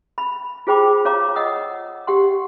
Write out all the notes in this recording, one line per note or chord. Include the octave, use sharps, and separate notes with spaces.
B5
F4 G#4 C5 G5 B5 D6
F4 C#5 F5 A#5 D6
D#5 F#5 D#6 E6
G4 F#5 C6